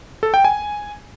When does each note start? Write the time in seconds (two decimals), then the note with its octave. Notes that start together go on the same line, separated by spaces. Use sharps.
0.23 A4
0.34 G5
0.45 G#5